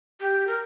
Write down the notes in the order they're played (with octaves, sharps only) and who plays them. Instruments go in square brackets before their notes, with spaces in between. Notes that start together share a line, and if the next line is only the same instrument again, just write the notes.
[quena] G4
A#4